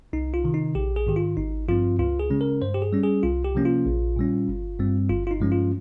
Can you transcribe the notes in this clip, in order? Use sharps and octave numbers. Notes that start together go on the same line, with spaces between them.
C2 D#4
F4
C3 D#3
D#4
A#1 G4
G#4
G#2 D#3 G4
F4
G#1 D#4
G2 F3 C4 F4
C#2 F4
G#4
C#3 G#3 C#4
A#4
G2 C5
G4
G#4
G3 C#4
G#4
C2 F4
G4
C3 F3 A#3 C#4
F4
A#1
A#2 G3 C#4
G1
G2 G3 C4
G1 F4
F4
D#4
G2 F3 G#3 C#4
F4